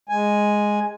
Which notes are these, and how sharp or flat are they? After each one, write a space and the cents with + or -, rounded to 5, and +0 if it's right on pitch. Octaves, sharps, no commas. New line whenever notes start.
G#3 +0 G#5 +0